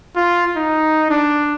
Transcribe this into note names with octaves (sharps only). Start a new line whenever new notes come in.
F4
D#4
D4